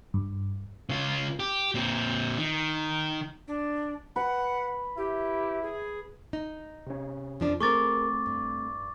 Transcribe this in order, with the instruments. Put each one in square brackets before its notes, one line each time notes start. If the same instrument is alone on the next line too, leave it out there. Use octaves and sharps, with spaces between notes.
[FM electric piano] G2
[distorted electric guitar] C#3 F4
G4
A#2 C4
D#3
[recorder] D4
[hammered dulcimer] B4 [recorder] F#5
[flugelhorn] E4 [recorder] G4
[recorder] G#4
[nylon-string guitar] D#4
[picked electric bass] C3 C#4
[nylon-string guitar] F2 F3 D4
[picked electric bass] A3 A#3 C4 [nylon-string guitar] G#4 A#4 [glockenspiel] C#6 D6 A6
[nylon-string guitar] G2